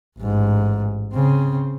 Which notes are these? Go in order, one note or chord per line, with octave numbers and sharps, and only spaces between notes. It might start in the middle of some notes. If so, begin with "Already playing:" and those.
A1 G#2
C#3 C4